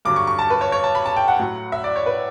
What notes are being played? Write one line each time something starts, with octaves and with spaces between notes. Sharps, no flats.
G2 D3 F#3 D6
C#6
C#6
A5
B4
C#5
C#5
A5
B5
A5
G5
F#5
A2 F#3
E5
D5
C#5
B4